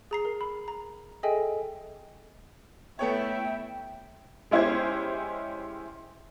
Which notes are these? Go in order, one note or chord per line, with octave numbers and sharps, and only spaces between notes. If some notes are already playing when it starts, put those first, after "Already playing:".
G#4 A#5 C7
A#4
B5
A#5
G#4 A4 D#5 E5 G5 G#5
A3 B3 E4 C#5 E5 G5
G#3 C#4 E4 G4 C5 G#6